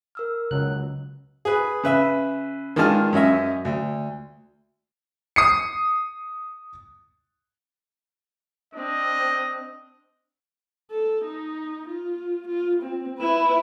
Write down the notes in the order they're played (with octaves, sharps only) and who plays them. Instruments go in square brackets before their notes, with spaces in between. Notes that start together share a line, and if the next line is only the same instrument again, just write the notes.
[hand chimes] A#4 E6 F6
[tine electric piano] C#2 F#3 F#6 [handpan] C#3
[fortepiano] G#4 B4
C#3 B4 E5
D#3 G#3 D4 F4 A5 F6
F#2 C#4 D#5 E5
D2
[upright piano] D#6 C7 C#7
[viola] C4 D4 [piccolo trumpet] D#5
[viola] A4
D#4
F4
F4
C4
E4 B4